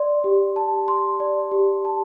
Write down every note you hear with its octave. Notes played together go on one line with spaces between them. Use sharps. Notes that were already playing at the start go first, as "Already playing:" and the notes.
Already playing: D5 C6
G4
A5
C6
D5
G4
A5